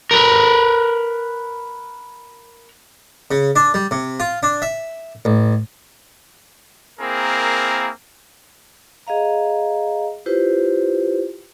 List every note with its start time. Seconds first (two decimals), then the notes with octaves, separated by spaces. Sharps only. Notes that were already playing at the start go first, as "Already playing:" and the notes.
0.11 A#4 B4
3.31 C#3
3.56 D4
3.74 G3
3.91 C3
4.20 F4
4.43 D4
4.62 E5
5.25 A1
6.99 A#3 C4 E4 G#4 A#4
9.07 G#4 D#5 F5 A#5
10.26 E4 F4 G4 B4 C5